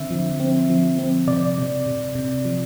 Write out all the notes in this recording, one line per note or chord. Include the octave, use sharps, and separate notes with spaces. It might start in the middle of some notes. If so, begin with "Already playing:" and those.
Already playing: D3 C4 E5
F3
C4
F3
C4
C3 D5
C3
C3
C3
F3